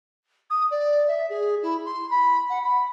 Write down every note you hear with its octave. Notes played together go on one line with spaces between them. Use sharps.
D#6
D5
E5
G#4
E4
C6
B5
F#5
B5